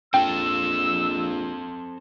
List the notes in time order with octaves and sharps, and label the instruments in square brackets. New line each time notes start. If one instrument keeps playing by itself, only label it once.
[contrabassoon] A#1 [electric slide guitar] C4 A4 [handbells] G5 [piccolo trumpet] E6